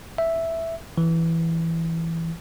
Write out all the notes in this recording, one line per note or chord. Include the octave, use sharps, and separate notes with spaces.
E5
E3